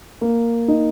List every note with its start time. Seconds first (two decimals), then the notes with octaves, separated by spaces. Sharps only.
0.21 A#3
0.68 D#4